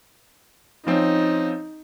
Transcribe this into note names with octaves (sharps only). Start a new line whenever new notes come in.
F3 C4 C#4 D#4